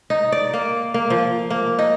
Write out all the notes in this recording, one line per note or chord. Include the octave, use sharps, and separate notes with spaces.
D#4
D5
A#3
A#3
F3
A#3
D#4